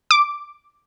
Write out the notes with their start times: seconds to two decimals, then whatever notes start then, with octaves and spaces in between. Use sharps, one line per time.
0.11 D6